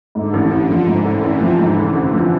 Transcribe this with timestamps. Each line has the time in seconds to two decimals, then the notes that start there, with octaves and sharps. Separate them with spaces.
0.15 G#2 D3
0.33 A1
0.51 A1
0.70 F3
0.87 G#2 C3 E3
1.05 A1
1.23 A1
1.41 F3
1.59 G#2
1.77 A1
1.95 A1
2.13 F3